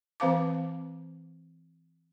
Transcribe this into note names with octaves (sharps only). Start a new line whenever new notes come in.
E3 C4 C5 F5 A5 D6